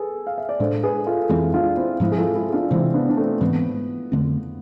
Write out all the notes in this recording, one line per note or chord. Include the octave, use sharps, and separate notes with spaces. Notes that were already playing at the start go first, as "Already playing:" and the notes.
Already playing: G#4 A4 B4
F5
E5
D5
A2 G#3 D4 A4 C5
G#4 B4
F4 A4
A4
F2 E3 G#3 C4 E4 G#4
D4 F4
C4 E4
G#2 F3 G#3 C4 E4
G#4
F4 A4
E4 G#4
G#4
D4 F4
C3 E3 G#3 C4 E4
B3 D4
D4
A3 C4
G#2 E3 G#3 B3 C4
F2 D3 A3 C4